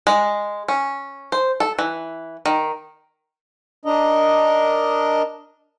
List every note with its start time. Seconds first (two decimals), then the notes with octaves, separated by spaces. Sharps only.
0.07 G#3
0.68 C#4
1.32 C5
1.60 A4
1.79 E3
2.46 D#3
3.85 D4 A#4 D#5